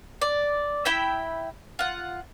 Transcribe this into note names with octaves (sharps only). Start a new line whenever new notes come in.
D5
E4 E5 G5 B5
F4 F#5